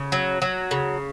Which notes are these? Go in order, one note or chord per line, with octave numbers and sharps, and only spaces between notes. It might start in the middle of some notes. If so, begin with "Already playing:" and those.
Already playing: C#3
F#3
F#3
C#3